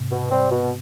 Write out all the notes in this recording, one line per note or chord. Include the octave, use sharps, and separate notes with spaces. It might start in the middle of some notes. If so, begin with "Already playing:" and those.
Already playing: G#2 C3
B2
G3 C4
B2